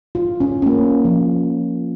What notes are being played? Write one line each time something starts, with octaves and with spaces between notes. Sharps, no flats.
F4
C#4
C#4
A#3
F3